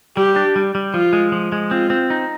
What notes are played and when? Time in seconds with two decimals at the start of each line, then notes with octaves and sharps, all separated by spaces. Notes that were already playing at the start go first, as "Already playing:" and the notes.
0.17 G3 G4
0.36 D4
0.56 G3
0.75 G3
0.94 F3 F4
1.13 G#3
1.32 F3
1.52 G#3
1.71 C4 F4
1.90 C4
2.10 D#4